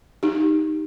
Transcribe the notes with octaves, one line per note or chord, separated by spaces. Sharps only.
D#4 G4